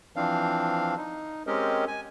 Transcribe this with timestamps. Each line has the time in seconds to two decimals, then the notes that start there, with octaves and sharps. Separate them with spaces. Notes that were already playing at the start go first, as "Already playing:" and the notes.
0.16 E3 F3 C4 D4 F5
0.97 D#4
1.47 G#3 C4 C#4 G4 A#4 D#5
1.87 G#5